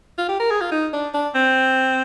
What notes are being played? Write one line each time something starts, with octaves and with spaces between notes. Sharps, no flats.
F4
G4
A#4
G#4
F4
D#4
D4
D4
C4